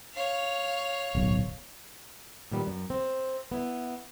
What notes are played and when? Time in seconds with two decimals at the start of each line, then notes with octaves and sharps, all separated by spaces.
0.13 C#5 F5
1.15 D1 B1
2.52 A#2 D#3 G3 B3
2.67 F#2
2.90 C4
3.52 B3 E4